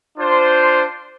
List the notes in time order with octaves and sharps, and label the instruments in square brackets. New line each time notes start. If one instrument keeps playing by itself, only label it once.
[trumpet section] D4 F4 C5